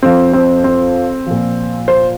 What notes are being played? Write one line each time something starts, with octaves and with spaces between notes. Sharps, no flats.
F2 F3 C4
C4
C4
A#2 F3
C5